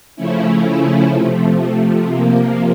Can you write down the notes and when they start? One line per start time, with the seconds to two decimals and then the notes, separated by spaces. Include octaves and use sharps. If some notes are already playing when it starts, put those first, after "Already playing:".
0.16 C#3 F3 A3 C#4 E4
1.10 C3 F3 A3
2.06 C3 F3 A#3